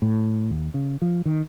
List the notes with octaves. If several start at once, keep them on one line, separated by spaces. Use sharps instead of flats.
A2
D#2
C#3
F3
D#3